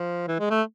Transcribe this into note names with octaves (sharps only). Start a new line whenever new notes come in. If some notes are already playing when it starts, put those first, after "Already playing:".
Already playing: F3
E3
G#3
A3